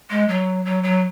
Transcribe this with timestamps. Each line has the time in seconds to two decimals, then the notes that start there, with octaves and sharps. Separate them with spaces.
0.10 G#3
0.28 F#3
0.65 F#3
0.83 F#3